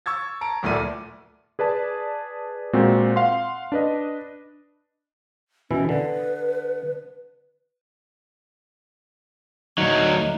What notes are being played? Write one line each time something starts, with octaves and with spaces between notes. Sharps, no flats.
C#6 E6 G#6 A6
A5 A#5 D7
D1 D2 A#2 A3 D5 D#7
G#4 B4 D5 A5
A#2 G#3 C4 F#4
F5 F#5 C6
D4 B4 D#5
B2 E3 C#4 E4
D3 B4
D2 F#3 A3 D#4